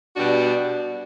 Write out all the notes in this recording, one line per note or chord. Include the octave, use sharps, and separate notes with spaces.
B2 G3 D4 F#4